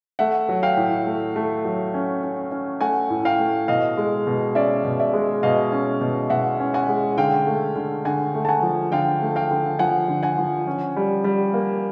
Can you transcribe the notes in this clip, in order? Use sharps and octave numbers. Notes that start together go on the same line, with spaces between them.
A3 E5 F#5
F#3
F5 G5
A2
A3
A3
F#3
C#4
C#4
C#4
A3 F#5 G#5
A2
F5 G5
A3
B2 D#5 F5
G#3
B2
C#4 D5 E5
B2
D5 E5
G#3
B2 D#5 F5
C#4
B2
B2 E5 F#5
C#4
F#5 G#5
G#3
D3 F5 G5
A3
D3
D3 F#5 G#5
A3
A5
F#5 G#5
F3
D3 F5 G5
A3
F5 G5
D3
F3 F#5 G#5
D3
F#5 G#5
F3
C#4
G3
G3
A#3